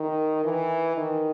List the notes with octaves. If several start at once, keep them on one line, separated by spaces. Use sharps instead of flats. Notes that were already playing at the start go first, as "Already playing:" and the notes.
Already playing: D#3
E3
D#3